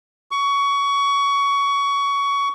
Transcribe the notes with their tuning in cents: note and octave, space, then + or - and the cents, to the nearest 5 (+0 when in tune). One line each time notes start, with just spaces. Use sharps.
C#6 +20